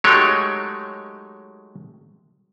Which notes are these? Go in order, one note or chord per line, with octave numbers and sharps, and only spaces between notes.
F#3 G#3 A3 D#4 G4 C#5